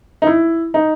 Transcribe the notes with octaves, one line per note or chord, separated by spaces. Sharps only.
D#4
E4
D#4